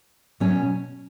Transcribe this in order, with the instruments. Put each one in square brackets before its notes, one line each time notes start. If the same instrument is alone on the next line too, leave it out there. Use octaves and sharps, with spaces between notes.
[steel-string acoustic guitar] B2 F#3 C#4